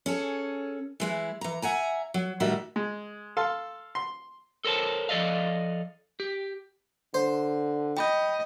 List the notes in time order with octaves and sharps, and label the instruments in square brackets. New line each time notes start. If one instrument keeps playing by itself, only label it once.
[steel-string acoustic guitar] C#4 G#4 A4
E3 G#3 E4
E3 A#5
E5 F#5 G#5 A#5
F#3
A2 D3 D#3 G3 F#4 E5
[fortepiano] G#3
A4 F5 C6
C6
[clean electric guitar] A4 A#4 C5 C#5 A5
F3 A4 D5 D#5 F5
G4
[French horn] D3 [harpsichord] C5
[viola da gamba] D#5 [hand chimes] G5 B5 G6